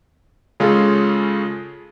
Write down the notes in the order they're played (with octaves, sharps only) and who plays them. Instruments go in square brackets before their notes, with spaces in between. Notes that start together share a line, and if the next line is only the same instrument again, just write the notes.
[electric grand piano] C#3 G#3 C#4 F4 A4